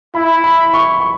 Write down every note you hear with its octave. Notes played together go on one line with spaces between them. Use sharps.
E4 B5
B5
C#6
C#6